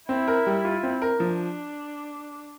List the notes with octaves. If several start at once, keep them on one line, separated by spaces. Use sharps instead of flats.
C4 E4
A#4
G3
F4
C4
A#4
F3 D4